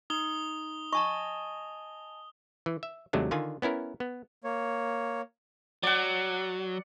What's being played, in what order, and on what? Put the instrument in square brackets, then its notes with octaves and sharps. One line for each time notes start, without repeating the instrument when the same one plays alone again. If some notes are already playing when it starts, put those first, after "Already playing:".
[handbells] D#4 [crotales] D#6 G7
[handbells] D#5 G#5 A5 [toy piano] C#6
[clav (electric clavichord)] E3
E5
D#2 C3 F#3 G#3 A3 D4
D3 D#3 F4 G#5
B3 C#4 E4 A#4
B3
[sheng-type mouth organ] A#3 C#5
[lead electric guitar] F#3 [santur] D5 F#5